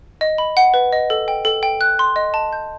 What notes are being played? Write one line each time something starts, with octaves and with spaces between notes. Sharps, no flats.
D#5
B5
F#5
B4
D#5
A4
G5
A4
G5
F#6
C6
D#5
A5
G6